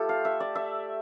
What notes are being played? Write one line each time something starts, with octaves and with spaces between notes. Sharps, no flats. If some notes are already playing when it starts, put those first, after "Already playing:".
Already playing: A3 F4 G4 A4
F5
E5
D5
E5